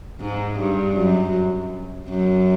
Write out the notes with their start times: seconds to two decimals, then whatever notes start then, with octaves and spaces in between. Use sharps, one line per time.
0.20 G#2
0.59 G2
0.97 F#2
2.09 F#2